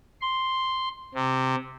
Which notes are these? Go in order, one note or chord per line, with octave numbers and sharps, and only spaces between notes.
C6
C3